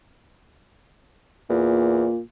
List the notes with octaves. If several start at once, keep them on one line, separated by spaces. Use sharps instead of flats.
E2 A#2